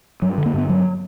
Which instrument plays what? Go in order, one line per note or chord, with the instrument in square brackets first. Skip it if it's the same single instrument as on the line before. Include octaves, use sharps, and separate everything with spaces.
[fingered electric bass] G2 F#3
D3
A#3
G2 B3
G2 F#3